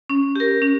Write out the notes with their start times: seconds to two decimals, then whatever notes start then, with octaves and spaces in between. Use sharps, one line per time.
0.10 C#4
0.36 G4 A#4
0.62 C#4